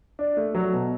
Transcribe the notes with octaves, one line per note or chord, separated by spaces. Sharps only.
D4
A3
F#3
B2